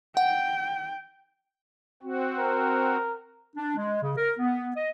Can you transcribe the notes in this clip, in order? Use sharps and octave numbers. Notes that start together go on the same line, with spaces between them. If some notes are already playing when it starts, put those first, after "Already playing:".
F#5 G5
C4 F#4
A#4
D4
G#3
C#3
A#4
B3
D#5